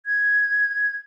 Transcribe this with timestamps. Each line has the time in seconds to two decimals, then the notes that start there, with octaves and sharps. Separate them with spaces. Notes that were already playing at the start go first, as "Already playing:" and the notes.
0.06 G#6